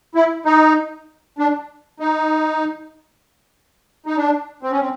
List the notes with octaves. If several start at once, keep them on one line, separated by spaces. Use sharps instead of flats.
E4
D#4
D4
D#4
D#4
D4
C4
C#4
C4